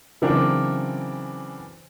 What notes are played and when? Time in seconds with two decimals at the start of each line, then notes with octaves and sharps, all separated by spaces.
0.22 C#3 E3 F#3 C4 D4 A#4